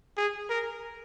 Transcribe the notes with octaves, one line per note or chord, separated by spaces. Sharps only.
G#4
A#4